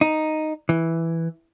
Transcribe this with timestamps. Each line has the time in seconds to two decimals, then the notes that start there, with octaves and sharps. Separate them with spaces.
0.01 D#4
0.69 E3